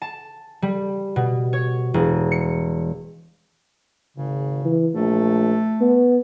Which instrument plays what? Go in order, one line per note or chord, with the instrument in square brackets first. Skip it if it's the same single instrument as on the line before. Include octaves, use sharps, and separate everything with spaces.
[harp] A5
G3
B2
C#5
E1
C#7
[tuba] G#1 [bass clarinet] C#3
[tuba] E3
[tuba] A#1 [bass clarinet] A3
[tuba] B3